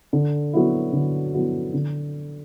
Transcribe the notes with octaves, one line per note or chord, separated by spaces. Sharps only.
D3
F#3 B3 E4
D3
F#3 B3 E4
D3